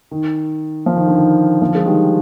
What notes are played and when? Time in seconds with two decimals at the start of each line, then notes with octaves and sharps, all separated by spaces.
0.11 D#3
0.86 F3
0.96 D#3
1.07 D3
1.18 D#3
1.60 D3 F3
1.75 G#3
1.85 D#3 G3